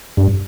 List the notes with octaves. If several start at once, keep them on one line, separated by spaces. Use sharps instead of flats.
G2